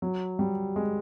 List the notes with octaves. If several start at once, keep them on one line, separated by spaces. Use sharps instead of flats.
F#3
G3
G#3